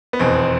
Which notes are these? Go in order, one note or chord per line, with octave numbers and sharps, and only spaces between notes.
B3
F1 E2 B2 C4